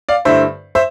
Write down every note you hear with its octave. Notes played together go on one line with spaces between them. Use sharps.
D5 F5
G2 D3 A3 E4 C5 E5
C5 E5